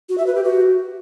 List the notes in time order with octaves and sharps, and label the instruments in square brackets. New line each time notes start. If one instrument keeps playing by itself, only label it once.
[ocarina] F#4
E5
B4
G4
F#4